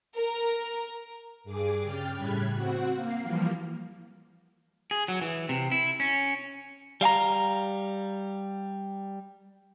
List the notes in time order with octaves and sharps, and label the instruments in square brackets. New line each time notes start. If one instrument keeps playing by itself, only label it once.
[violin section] A#4
[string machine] G2 G#4 D6
C#3 G5 F6 A6
A2 C#3 G3 B5 F#6 G#6
C4 F#4 F#5
A#3 F5
E3 F3 G3 A#3
[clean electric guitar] G#4
F#3
E3
C3
E4
C#4
G3 F5 G5 A#5